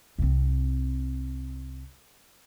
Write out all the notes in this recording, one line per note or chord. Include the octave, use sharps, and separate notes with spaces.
C2 C4